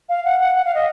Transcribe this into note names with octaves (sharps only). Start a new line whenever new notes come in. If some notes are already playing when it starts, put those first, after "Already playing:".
F5
F#5
F#5
F#5
F5
D#5